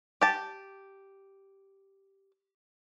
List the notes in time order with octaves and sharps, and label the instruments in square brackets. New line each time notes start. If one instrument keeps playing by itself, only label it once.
[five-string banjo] G4 A5